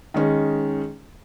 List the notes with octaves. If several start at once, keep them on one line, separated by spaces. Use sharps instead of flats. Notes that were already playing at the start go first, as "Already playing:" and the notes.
D#3 G#3 C#4